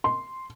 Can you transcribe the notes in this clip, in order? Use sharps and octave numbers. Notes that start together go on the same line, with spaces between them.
C6